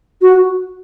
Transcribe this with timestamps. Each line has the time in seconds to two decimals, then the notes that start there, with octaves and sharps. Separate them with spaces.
0.22 F#4